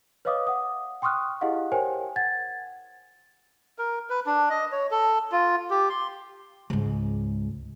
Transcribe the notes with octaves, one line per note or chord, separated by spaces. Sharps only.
B4 C#5 D#5 F5 D6 D#6
F#5 D#6
G5 C6 C#6 D#6 F6 F#6
E4 G4 G#4 D#5 F5 F#5
G4 A#4 C5 C#5 G5 G#5
F#5 G#6 A6
A#4
B4
D4
D#5
C#5
A4
F4
G4
C6
C#2 G#2